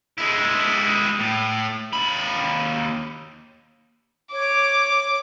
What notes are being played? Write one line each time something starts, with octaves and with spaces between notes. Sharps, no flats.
G#3 E4
A2
D#2 B5
C#5 D6